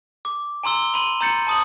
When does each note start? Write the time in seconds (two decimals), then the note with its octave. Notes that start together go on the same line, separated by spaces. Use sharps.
0.25 D6
0.64 G#5 A#5 C6 E6 G7
0.94 B5 C6 D#7 F#7
1.21 A#5 C6 G6 A6 C#7
1.47 A5 D#6 F#7